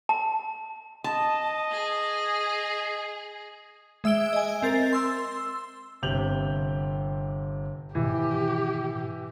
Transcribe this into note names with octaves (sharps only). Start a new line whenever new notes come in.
A5
D#5 A5
G#4
G#3 E5 E6 D7 G7
D#5 G#5
C4 A#4 A6
C6 E6
G1 C3 G4 G6 F7 F#7
G#2 B2 D#3 E3 G4